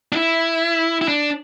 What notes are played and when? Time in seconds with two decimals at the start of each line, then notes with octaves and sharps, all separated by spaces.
0.12 D4
0.16 E4
1.01 E4
1.08 D4